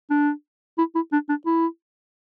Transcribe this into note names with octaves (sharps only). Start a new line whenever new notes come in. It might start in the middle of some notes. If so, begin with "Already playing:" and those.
D4
E4
E4
D4
D4
E4